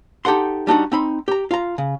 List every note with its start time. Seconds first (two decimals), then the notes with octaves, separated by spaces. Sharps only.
0.25 D#4 G4 A4 F#5 C6
0.67 G3 D4 D#4 F#4
0.92 C4 D#4 B5 C6
1.28 G4 A#5
1.51 F4 A#5
1.78 C#3